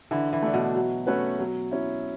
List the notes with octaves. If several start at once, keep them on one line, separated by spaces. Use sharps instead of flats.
D3 E3
E3
A3 D4
B2
F#3
A3 C#4 F#4 B4
F#3
C#4 E4